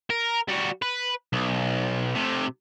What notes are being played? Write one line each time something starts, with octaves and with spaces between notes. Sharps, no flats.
A#4
G3 F#4
B4
B1
C3 A3